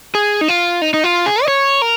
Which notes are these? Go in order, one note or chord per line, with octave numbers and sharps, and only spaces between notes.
G#4
D#4
F4
D#4
D#4
F4
G#4
D#5
C#5
A#4